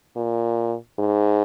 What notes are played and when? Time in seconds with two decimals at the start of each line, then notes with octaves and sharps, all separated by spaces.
0.16 A#2
0.99 G#2